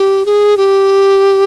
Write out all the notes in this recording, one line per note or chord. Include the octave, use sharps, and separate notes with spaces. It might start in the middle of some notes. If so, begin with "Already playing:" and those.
Already playing: G4
G#4
G4